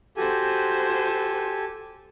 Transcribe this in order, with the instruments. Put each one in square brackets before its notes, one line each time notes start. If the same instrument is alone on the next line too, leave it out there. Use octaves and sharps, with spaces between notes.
[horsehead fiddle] F#4 C5 [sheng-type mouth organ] G4 A4 G#5